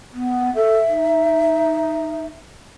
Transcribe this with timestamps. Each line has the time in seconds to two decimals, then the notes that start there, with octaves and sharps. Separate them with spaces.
0.13 B3
0.55 A4 E5
0.88 D#4